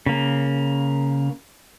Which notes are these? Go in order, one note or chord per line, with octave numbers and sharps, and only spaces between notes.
C#3 A#3